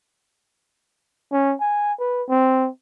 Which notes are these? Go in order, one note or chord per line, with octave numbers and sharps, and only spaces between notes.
C#4
G#5
B4
C4